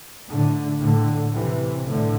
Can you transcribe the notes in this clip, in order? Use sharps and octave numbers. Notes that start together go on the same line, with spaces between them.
A2 D3
A2 D3
C3 E3
A2 D3